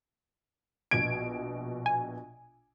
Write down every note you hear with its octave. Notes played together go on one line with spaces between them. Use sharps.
A#1 B2 G#6 D7
G#5